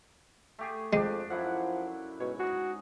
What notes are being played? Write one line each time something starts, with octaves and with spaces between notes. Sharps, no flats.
A3 G4 G#4
F2 G#3 D4 G4
F#2 F3 E4 F#5
G#2 B2 C#5
F#4 G#4 D#5